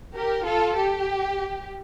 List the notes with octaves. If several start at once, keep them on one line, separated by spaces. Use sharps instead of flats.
G4 A#4
F4 A4
G4